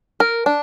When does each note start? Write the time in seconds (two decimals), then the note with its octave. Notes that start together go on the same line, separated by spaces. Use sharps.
0.20 A#4
0.46 D4